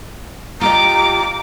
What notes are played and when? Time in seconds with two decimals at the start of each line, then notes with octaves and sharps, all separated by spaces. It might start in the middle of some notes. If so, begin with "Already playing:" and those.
0.61 F4 G4 D#5 A#5 D6